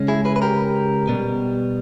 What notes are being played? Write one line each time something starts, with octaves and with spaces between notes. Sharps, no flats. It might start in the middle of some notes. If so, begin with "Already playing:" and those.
Already playing: C#3 G#3 C#4
E4 G#4
G#4 B4
B4
G4 A#4
B2 G3 B3